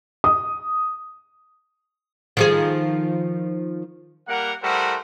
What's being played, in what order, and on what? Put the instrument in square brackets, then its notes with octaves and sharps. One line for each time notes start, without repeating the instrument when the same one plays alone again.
[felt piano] D#6
[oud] D#3 F3 G#4
[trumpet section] G3 A#3 A#4 F#5
G3 A3 E4 A#4 C5 F#5